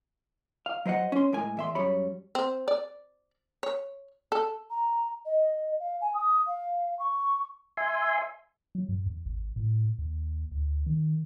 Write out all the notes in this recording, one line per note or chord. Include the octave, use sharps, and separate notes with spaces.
F5
F#3 C5 D#5 F#5
C#4 C6
A2 G#3 A#4 G#5
E2 E5 C6
F#2 G3 C#5 B5
C4
D5
C#5
A4
A#5
D#5
F5
G#5
D#6
F5
C#6
E5 G#5 C6
F#3
G2
E2
G#1
A2
D#2
D2
D#3